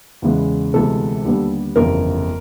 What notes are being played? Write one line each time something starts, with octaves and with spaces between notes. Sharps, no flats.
E2 C#3 E3 G#3 B3
D2 C3 E3 G#3 B3 A4
D#2 D3 G3 B3
G1 F2 C#3 E3 A3 A#4